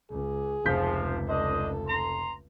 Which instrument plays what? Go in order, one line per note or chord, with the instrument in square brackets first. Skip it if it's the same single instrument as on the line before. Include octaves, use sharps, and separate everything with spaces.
[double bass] C#2 [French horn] G#4
[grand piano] F1 G6 B6 [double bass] C#2 [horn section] C3 F3
[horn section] D4 C5 D#5 [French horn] A4
[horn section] A#5 C6